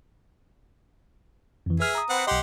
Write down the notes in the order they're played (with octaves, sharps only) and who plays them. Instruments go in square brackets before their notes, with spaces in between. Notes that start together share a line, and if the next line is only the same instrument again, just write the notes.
[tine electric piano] F2 E3
[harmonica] G#4 E5 [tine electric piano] B4 F6
[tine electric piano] A#5 D#6
[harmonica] C4 B4 F#5
[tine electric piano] B1 D#5 [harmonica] G4 F#5 C6